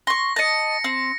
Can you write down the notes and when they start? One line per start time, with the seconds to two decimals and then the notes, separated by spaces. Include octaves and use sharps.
0.07 C6 C#6 A#6
0.36 D#5 A5 A#6 C#7
0.84 C4